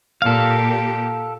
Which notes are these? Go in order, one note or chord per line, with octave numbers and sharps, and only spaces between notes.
A#2 G4 A4 F5